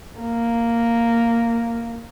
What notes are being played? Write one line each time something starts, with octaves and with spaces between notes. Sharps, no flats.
A#3